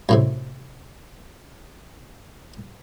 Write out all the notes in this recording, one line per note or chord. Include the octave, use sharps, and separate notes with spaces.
F#2 A2 C3